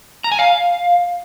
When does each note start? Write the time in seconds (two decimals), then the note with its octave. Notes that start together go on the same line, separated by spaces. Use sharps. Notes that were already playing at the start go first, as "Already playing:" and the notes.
0.24 A#5
0.32 G#5
0.39 F5